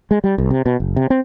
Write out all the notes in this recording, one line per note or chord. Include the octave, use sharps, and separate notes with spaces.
G#3
G3
C2
C3
B2
F#1
C3
C4